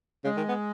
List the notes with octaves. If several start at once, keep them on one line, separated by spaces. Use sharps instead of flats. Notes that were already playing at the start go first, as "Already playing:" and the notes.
C#3 G#3
D#3
B3